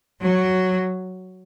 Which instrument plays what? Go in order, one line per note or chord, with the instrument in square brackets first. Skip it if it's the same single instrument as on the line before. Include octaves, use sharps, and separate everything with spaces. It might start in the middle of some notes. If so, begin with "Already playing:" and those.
[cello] F#3